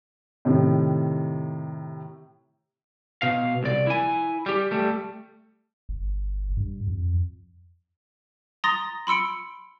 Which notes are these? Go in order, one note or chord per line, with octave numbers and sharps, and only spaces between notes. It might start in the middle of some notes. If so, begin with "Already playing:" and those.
A2 C3 D#3
B2 F5
C2 D5
E4 G#5
G3 G4
G3 A3
G1
G2
F2
A#5 C6 D#6 A6 A#6 G7
B5 C6 E6 C#7 D7